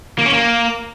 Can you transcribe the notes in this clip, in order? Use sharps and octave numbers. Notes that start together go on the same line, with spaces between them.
A#3
C#4
A#3